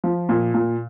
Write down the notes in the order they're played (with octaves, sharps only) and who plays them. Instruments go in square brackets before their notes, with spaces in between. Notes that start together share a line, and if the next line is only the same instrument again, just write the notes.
[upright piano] F3
A#2
A#2